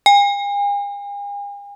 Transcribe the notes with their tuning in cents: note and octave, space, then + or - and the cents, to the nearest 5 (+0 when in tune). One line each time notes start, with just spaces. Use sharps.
G#5 -45